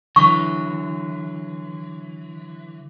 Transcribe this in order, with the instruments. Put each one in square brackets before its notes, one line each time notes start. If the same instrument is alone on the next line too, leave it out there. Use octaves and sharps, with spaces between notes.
[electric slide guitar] D3 E3 F#3 [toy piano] C#6